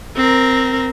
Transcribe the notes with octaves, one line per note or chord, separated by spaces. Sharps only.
C4 A#4